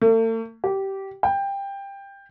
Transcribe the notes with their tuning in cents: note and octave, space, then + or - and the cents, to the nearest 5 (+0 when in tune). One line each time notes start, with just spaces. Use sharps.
A3 +45
G4 -15
G5 +15